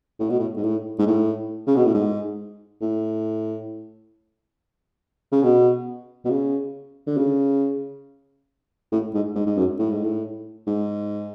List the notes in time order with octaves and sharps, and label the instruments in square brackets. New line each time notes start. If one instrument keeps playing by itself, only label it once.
[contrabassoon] A2
B2
A2
G#2
A2
G#2
A2
C#3
B2
A2
G#2
A2
C#3
B2
B2
C#3
D3
C#3
A2
G#2
G#2
G#2
F#2
A2
G#2
A2
G#2